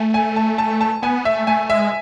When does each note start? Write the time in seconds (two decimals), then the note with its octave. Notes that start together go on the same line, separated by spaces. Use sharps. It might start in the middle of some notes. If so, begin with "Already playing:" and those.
Already playing: A3 G#5
0.14 G#5
0.36 A5
0.58 A5
0.81 A5
1.02 B3 G#5
1.25 A3 E5
1.47 A3 G#5
1.69 G#3 E5